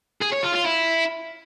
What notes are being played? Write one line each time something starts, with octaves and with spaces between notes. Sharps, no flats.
G#4
C#5
F4
F4
E4